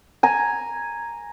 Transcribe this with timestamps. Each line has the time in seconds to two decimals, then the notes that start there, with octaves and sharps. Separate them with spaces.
0.23 G#5 A#5